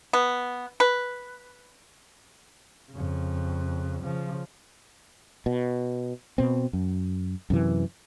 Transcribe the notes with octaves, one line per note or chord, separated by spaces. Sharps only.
B3
B4
F2 C#3
C#3 F3
B2
B2 C4
F#2
F#2 C3 E3